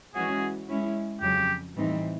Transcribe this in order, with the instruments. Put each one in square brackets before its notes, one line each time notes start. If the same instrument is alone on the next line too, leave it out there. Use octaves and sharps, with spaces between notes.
[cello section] E3 G#3 C#4 F#4 [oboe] G#4
[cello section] G#3 C#4 E4
[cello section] F2 C#3 F#3 [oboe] G4
[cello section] A2 E3 G3 C4 D#4